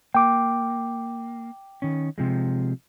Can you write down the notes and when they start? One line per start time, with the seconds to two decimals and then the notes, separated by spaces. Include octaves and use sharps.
0.14 A#3 G5 D6
1.82 D#3 C#4
2.18 C3 F3 G#3